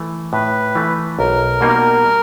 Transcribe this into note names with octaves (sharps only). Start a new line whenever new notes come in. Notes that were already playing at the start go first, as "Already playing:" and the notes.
Already playing: E3 A3
A2 B4
E3 A3
B1 A#4
B2 G3 A#3 D#4